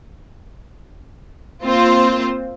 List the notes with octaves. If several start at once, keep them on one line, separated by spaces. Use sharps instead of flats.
A#3 C4 F4 C5